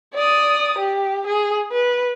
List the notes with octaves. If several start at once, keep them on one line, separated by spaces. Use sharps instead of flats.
D5 D#6
G4
G#4
B4